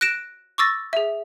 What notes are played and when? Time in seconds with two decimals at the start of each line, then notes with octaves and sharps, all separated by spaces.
0.01 F#6 A#6 D7 E7
0.58 C#6 D6 E6 A6 A#6
0.93 G#4 E5